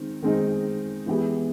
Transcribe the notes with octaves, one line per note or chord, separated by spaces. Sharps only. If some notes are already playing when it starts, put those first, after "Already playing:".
Already playing: D#3 G#3 C4 D#4
D#3 G#3 C4 D#4
E3 G#3 B3 E4 G4